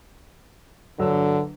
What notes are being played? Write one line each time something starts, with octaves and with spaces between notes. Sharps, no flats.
G1 D3 F#3 E6